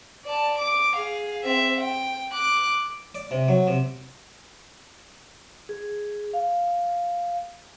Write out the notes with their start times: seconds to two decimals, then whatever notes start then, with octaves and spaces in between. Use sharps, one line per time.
0.25 D5 A5
0.59 D6
0.96 G#4 F5
1.44 C4 E5
1.81 G5
2.33 D6 F#6
3.15 D5
3.31 C3
3.48 F#3
3.67 C3
5.69 G#4
6.33 F5